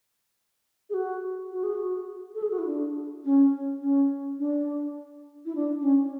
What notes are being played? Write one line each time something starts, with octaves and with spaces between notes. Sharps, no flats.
G#4
F#4
F#4
G#4
F#4
A4
G#4
F#4
E4
D4
C#4
C#4
D4
E4
D4
D4
C#4